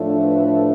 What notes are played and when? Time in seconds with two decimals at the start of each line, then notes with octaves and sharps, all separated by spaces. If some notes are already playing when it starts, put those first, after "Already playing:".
Already playing: A2 F3 A3 D4
0.25 B4